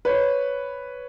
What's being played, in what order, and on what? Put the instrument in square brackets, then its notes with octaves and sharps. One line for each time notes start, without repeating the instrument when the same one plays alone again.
[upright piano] B4 C#5